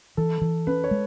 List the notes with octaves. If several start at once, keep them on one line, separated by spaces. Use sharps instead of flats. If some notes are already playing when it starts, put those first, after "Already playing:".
E3 A4
E3
C#4 B4
C#5
G#3